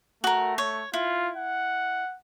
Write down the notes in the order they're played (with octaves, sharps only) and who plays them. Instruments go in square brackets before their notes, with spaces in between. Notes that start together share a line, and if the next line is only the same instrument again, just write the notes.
[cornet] A3 [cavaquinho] F#4 A#4
[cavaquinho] C#5
[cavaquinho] E4 [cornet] F4
[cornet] F#5